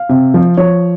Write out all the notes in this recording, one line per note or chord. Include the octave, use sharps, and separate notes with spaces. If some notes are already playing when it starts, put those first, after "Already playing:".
Already playing: F5
C3
F3
F3 C#5